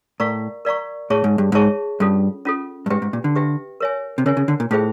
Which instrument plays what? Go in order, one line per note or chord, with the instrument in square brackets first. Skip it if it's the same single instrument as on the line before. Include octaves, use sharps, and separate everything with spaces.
[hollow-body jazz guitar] A2 [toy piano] A#4 D5 F5 A#5 C#6
[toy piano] A#4 D5 F5 A#5 C#6
[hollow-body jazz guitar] A2 [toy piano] G#4 C#5 E5 A5 C#6
[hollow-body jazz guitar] G#2
G2
[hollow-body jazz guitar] G#2 [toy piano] G#4 C#5 E5 A5 C#6
[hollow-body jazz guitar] G2 [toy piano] C#4 F4 A4
[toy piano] C#4 F4 A4
[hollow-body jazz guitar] G2
[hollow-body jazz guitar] G#2 [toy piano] G4 B4 E5 G5
[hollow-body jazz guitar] G#2
A#2
D3
[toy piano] G4 B4 E5 G5
A#4 C#5 E5 G#5
[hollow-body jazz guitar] C3
[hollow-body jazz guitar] C#3 [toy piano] A#4 C#5 E5 G#5
[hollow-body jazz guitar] C#3
D3
A#2
[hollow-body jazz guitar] A2 [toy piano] F4 G#4 C5 E5 G5